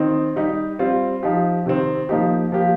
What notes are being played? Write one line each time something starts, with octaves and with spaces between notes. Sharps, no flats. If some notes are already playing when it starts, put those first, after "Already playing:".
Already playing: D#3 C4 D#4
G3 D#4 G4
G3 C4 F4
F3 D#4 G4
C3 D#3 C4
F3 A#3 D#4 G4
F3 A#3 G4